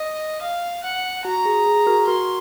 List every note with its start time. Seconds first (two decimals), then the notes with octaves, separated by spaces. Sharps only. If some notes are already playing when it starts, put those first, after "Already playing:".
Already playing: D#5
0.41 F5
0.84 F#5
1.25 F#4 A#5
1.45 G#4
1.66 G#4
1.86 F#4 A#4
2.07 F#4 A#4 C6